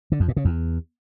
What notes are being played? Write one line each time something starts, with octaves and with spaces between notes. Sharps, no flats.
D3
F2
A#2
C#3
E2